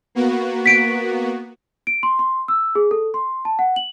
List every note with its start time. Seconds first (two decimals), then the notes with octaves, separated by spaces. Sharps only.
0.15 A#3 B3 F#4
0.66 B6 D7
1.87 D7
2.03 C6
2.19 C6
2.48 E6
2.75 G#4
2.91 A4
3.14 C6
3.45 A5
3.59 F#5
3.76 F#7